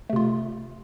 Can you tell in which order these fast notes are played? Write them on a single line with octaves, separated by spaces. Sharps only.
A3 C3 F4